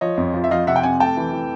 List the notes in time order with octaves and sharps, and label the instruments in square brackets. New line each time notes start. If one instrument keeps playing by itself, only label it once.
[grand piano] F3 [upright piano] C#5 D#5
[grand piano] F2
F3
[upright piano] E5
[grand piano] F3 [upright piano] D#5 F5
[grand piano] C3 [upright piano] E5 F#5
[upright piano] G5
[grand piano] C3 [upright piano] F#5 G#5
[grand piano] A3 [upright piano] G5 A5
[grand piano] E3
E3